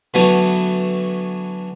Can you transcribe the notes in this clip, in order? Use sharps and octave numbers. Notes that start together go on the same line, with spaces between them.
D3 E3 F#3 A3 B3